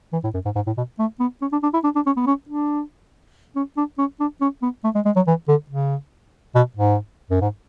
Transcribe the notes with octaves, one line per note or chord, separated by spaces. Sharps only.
E3
A2
F#2
G#2
G#2
A2
B2
A3
B3
C#4
D4
D4
E4
D4
D4
C#4
B3
C#4
D4
C#4
D4
C#4
D4
C#4
B3
A3
G#3
G#3
F#3
E3
D3
C#3
B2
G#2
F#2
G#2